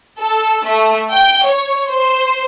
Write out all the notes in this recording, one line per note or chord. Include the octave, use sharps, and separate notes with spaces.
A4
A3
G5
C#5
C5